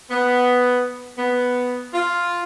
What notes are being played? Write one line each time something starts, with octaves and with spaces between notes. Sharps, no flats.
B3
B3
F4